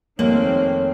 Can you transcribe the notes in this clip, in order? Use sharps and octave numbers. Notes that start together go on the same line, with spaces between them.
F1 D#3 A#3 C4 C#5 F#7